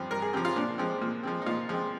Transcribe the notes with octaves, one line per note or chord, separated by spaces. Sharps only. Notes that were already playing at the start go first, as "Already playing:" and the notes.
Already playing: G2 F3 C4
G2 A#4
G#4
F3 C4 G4
F4
A#2 D4
F3 G#3 C4
A#2
F3 G#3 C4
D#4
A#2 F4
F3 G#3 C4